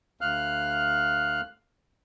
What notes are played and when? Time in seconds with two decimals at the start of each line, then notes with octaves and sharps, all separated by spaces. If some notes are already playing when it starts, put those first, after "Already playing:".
0.21 D2 F5 F6 F#6